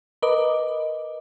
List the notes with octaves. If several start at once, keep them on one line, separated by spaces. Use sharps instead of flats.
A#4 B4 D#5 D6